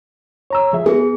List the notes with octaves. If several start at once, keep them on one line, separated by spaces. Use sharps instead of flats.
C#5 A#5 E6
F3 G#4 E5
B3 G#4